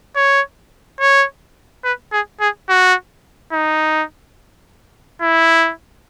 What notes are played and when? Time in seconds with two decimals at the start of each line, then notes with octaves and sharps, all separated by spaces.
0.16 C#5
1.00 C#5
1.84 B4
2.12 G#4
2.40 G#4
2.69 F#4
3.53 D#4
5.21 E4